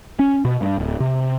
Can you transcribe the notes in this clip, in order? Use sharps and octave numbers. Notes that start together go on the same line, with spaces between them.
C#4
B2
G2
D1
C3